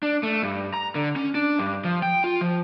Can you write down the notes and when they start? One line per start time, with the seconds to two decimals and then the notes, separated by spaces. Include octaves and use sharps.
0.03 D4
0.23 A3
0.43 G2
0.74 A#5
0.95 D3
1.16 C#4
1.35 D4
1.59 G2
1.84 F3
2.02 G5
2.24 F4
2.41 F3